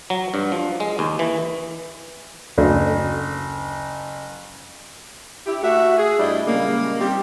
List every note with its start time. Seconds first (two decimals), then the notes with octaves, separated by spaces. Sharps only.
0.10 F#3
0.34 G2
0.52 F3
0.80 G#3
0.99 D#2
1.19 E3
2.58 F#1 D2
5.46 D4 E4 G4
5.62 A3 F#4 E5
5.97 G#4
6.18 G2 G3 A3 D4 E4 D#5
6.45 A#2 C#3 G3 G#3 A#3
6.99 G3 C4 D#4 G4